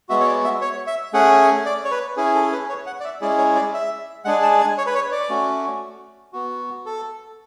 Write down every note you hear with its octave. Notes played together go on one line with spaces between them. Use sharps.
G#3 B3 F#4 E5
C#5
D5
E5
C#5
E5
A3 C#4 G#4 F#5
D5
C#5
B4
C#4 E4 G#4
A4
B4
C#5
F#5
D5
E5
G#3 C#4 E4 G#4 D5
C#5
D5
E5
G#3 D4 G#4 F#5
A5
G#5
C#5
B4
C#5
D5
A3 C#4 F#4
B3 F#4
A4